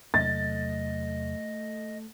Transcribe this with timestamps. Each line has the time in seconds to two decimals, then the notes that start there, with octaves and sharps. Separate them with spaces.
0.14 E2 C3 F#3 A3 D#5 A6